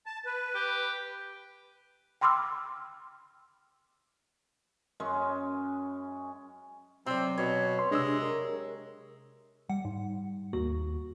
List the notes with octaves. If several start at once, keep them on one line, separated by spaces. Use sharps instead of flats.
A5
B4
G4
G5 B5 C6 D6 E6 F6
F#2 G#3 C#4
C3 F#3 C4 D5
B2 C#5
C6
C3 G#3 D4 E6
A#4
G3 F#5
G#2
D#2 A#3 F#4